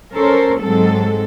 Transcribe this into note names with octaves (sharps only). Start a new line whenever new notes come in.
C#4 A4 A#4 C5 C#5
G#2 F#3 G#3 C4 A4